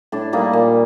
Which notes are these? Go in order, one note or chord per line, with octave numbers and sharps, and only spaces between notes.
A2 D4
G3 A#3 D#4
A#2